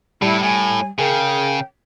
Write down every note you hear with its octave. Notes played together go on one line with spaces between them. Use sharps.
A2 G3 E4
A2 G#5
C#3 G#4 A#4 G5